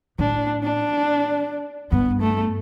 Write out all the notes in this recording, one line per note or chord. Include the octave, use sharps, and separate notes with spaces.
A2 D4
D4
G2 B3
A3